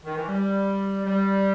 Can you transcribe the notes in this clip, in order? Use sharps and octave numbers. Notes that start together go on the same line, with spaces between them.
D#3
E3
G3
G3